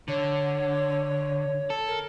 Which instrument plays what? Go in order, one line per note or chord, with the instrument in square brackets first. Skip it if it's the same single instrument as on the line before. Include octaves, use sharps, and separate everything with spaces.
[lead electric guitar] D3 [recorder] C#5
[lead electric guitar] A4
[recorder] A#4